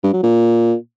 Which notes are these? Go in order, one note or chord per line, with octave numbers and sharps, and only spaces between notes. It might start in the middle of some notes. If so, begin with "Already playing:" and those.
G2
F#3
A#2